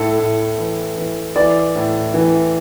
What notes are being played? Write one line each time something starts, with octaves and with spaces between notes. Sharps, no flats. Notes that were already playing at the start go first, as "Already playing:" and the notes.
Already playing: A2 A4
A2
E3
E3
E3 D5
A2
E3